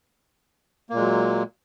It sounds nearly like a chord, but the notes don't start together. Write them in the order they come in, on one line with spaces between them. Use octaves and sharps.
A#3 A#2 G#3 F#3